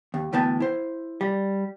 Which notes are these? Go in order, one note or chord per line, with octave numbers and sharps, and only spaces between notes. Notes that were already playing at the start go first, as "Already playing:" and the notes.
D#2
D2 A2 E3 B3 G5 A5
E4 C5
G3